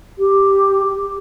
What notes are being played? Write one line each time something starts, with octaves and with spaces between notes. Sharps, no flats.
G4